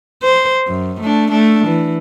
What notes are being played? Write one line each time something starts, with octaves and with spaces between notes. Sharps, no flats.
C5
F#2
A3 D4
A3 D4
E3